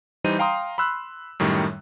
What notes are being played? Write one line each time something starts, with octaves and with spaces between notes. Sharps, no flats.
E3 G3 D#4 C5 D#7
F5 G5 A#5 C6 D#6
B5 C6 E6 F#6
F#2 A2 D#3 G3